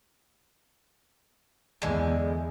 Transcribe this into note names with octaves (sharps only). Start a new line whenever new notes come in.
E2 D3 G#3